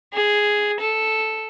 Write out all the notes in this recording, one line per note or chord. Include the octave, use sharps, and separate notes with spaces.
G#4
A4